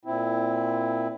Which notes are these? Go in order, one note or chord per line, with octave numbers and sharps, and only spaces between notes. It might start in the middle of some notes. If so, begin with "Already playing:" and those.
A#2 C4 E4